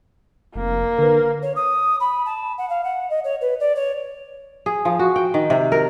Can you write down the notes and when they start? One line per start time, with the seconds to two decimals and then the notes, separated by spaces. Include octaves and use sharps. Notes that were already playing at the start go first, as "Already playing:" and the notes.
0.55 F1 A#3
0.98 D3 A#4 B4
1.42 C#5
1.56 D#6
2.00 B5
2.25 A5
2.58 F#5
2.70 F5
2.84 F#5
3.10 D#5
3.24 C#5
3.41 B4
3.60 D5
3.76 C#5
4.66 G#4
4.85 F3
4.99 F#4
5.16 G5
5.34 D#3
5.50 C3
5.72 A#4